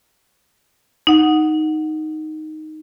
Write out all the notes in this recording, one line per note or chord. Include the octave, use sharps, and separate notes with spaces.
D#4 F#5